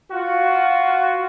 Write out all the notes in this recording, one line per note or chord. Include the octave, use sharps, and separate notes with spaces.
F4 F#4